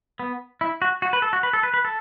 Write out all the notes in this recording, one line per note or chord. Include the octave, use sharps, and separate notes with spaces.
B3
E4
F#4
F#4
B4
A4
F#4
B4
A4
B4
B4
A4